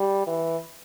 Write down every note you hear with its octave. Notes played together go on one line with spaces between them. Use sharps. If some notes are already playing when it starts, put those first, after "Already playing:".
Already playing: G3
E3